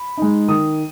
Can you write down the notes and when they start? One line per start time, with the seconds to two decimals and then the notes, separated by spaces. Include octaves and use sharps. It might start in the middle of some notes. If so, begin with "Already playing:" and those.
Already playing: B5
0.17 G#3 D#4
0.48 D#3 D#6